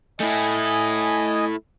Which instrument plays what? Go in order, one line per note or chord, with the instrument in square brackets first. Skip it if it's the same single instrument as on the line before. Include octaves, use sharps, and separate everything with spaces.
[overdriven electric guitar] A3 E4 [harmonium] D#5 G#5